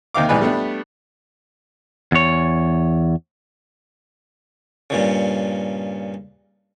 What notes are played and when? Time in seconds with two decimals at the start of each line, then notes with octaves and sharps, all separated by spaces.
0.14 D#2 C3 D#3 F5 D6
0.29 A#1 E2 G#2 G#4 B4 D5
0.41 G3 A3 B3 D4
2.12 E2 C#5
4.90 G2 A#2 C#3